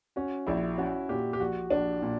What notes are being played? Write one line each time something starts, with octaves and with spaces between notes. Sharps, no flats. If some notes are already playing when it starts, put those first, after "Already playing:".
C#4 F#4
A#1 E4
C#4 F#4
A#2 G4
G4
A#1 F#4
A#1 D4
A#2